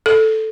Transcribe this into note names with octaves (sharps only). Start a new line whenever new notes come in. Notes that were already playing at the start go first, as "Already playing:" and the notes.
A4